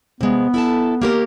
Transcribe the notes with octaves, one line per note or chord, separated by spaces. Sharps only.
C3 G#3 B3
E4 A4 A5
A#3 G4 A#4